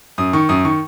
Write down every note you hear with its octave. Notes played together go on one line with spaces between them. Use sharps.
F#2 D#6
D#3 C#6
F#2 D#6
D#3 C#6